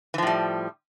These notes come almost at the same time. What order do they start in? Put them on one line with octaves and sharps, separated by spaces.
E3 F3 A2 G3